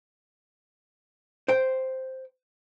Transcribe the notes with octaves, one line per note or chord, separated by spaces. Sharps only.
C5 G5